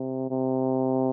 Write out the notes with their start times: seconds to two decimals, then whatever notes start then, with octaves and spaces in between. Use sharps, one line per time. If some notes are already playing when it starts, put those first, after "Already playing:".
Already playing: C3
0.31 C3